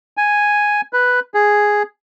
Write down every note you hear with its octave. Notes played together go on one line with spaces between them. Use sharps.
G#5
B4
G#4